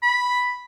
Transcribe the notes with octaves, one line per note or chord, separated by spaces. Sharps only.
B5